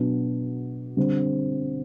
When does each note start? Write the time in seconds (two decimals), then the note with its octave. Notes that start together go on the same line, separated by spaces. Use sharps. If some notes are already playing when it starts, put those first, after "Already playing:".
Already playing: B2 F#3 B3 D4
0.97 D3 G3 C4